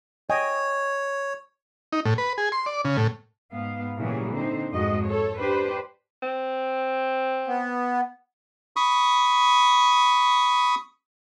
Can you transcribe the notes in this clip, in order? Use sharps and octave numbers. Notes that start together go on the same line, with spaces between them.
C#5 D#5 G5 G#5
D#4
A2
B4
G#4
C6
D5
C#3
A2
G#2 B3 F5
A#2 C#3 E3 F#3 G3 G#4
D3 C4 D#4 C5
F2 G#2 G#3 F#4 D#5
A4 C#5
D4 G4 B4 C5
C4
B3
B5 C#6 D#6